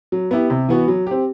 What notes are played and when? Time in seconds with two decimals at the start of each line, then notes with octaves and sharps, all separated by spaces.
0.12 F#3
0.31 B3 E4 G4
0.50 C3
0.69 E3 B3 F#4
0.88 F#3
1.07 C4 G4